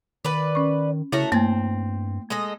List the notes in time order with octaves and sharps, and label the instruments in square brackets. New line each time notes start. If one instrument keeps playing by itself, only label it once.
[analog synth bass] D#3 [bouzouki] B4 D5
[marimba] C#4 C#6
[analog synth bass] C#3 [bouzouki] A3 F#4 A#4 [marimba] E4 C#5
[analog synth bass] G2 [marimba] A3 A#3 [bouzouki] C4
[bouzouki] G#3 A4 D#5